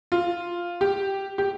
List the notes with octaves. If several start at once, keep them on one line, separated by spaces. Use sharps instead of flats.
F4
G4
G4